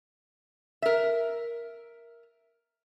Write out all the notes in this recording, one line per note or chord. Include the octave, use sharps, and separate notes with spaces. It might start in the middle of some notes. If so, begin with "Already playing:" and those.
A#4 E5